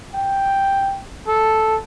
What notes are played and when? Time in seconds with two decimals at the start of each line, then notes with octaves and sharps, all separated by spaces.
0.15 G5
1.28 A4